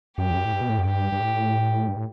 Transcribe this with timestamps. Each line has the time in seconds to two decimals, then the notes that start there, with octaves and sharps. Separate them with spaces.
0.18 F#2 G4
0.30 E2
0.35 F#2
0.45 A2
0.53 G2
0.61 B2
0.69 A2
0.78 F#2
0.86 G2 G4
1.12 G2
1.21 A2
1.88 G2
1.96 A2